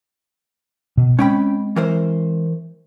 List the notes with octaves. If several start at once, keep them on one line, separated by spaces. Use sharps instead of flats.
B2
G#3 C4 C#4 G5 B5
E3 A#4 C5